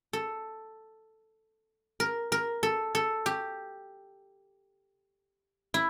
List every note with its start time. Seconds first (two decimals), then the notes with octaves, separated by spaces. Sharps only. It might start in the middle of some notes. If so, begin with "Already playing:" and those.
0.13 A4
2.00 A#4
2.32 A#4
2.63 A4
2.95 A4
3.26 G4
5.74 E4